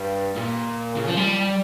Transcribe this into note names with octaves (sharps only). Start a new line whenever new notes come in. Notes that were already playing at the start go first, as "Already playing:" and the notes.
Already playing: G2
A#2
C#3
F3
G3